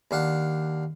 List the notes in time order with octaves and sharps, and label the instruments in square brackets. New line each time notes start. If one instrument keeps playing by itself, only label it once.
[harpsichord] D#2 D4 F5 F#5